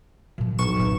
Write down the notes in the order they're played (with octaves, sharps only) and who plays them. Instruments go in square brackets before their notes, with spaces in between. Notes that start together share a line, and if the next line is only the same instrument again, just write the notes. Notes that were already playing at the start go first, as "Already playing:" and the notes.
[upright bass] A#2 F3
[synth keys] B1 C#6 E7
[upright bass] A#2 C#4